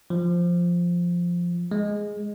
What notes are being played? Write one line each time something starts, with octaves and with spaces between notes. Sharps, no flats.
F3
G#3